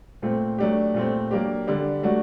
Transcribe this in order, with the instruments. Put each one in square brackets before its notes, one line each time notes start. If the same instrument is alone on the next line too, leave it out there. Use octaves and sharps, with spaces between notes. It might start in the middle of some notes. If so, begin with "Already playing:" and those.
[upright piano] A#2 A3 C4
F#3 A3 D4 G4
A#2 A3 C4
F#3 A#3 D4 G4
D3 G3 D4 G4
F#3 A3 D4 F#4